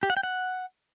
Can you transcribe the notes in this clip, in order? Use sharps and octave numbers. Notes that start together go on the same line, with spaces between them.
G4
F#5
G5
F#5